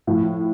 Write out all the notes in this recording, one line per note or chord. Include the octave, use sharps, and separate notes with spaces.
A2 F3